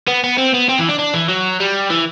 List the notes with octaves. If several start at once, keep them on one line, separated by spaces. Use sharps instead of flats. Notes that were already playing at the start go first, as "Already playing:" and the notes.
B3
B3
C4
B3
C4
E3
D4
D4
E3
F#3
G3
E3